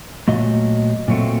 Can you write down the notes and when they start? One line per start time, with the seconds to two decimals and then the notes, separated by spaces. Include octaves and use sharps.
0.28 A#2 F#3 A3 D#5
1.08 A#2 F#3 A3 C4